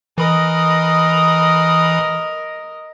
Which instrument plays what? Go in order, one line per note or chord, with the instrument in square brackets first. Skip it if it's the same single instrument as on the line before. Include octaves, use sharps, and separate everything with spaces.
[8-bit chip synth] E3 B5 D#6 [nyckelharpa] A#4 D#5